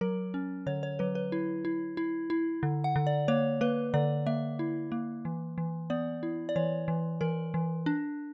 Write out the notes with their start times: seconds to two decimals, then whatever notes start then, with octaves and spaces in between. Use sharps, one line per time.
0.01 F#3 A#4
0.34 C#4
0.66 D3 C#5
0.83 C#5
0.99 F#3 B4
1.15 B4
1.32 E4
1.65 E4
1.97 E4
2.30 E4
2.63 D3
2.84 F#5
2.96 D3
3.07 D5
3.28 A#3 C#5
3.61 A#3 B4
3.94 D3 D5
4.26 A#3 E5
4.59 E4
4.92 A#3
5.25 E3
5.58 E3
5.90 B3 D5
6.23 E4
6.49 D5
6.56 E3 C#5
6.88 E3
7.21 E3 A#4
7.54 E3
7.86 D4